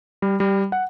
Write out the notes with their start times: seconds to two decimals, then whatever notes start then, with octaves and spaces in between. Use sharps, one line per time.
0.22 G3
0.40 G3
0.72 F#5